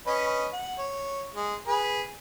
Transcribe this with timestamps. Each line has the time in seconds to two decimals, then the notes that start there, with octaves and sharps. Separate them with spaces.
0.07 C#4 B4 D#5
0.53 F#5
0.78 C#5
1.35 G#3
1.68 G#4 B4